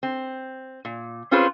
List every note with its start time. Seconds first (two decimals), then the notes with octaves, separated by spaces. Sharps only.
0.03 C4
0.85 A#2
1.31 C4 C#4 F4 G#4 B4 C5